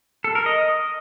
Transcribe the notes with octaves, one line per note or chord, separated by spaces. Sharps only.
A4
A#4
D#5